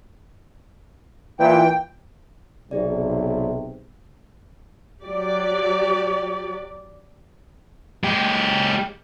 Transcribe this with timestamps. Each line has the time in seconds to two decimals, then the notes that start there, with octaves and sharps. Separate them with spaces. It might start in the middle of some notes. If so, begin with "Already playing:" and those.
1.40 A#2 E3 G5
2.71 B1 C3 B3 G#4 D5
5.04 F#3 G4 D5
8.04 G#3 G4